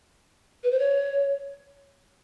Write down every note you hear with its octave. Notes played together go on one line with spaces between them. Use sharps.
B4
C5
C#5